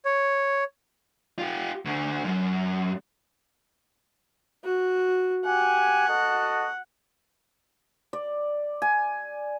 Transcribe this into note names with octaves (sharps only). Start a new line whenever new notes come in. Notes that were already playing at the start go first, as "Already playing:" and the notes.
C#5
F4 G4
D2 D3
F#2
F#4
G4 F#5 G#5
F#4 A4 D#5
D5
G#5